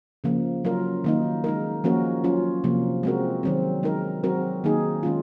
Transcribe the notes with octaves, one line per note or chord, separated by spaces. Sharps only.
C#3 F3 A#3
F#3 C#4 F4 A#4
D#3 A#3 D#4
G#3 D#4 A#4
F3 A#3 C#4 F#4 A#4
F#3 C#4 F4
C3 F3 A#3
G#3 C4 F#4 A#4
D#3 F#3 C4
G#3 D#4 A#4
F#3 C4 F#4 A#4
D#3 A#3 D#4 G#4
D#3 G#3 C#4 F4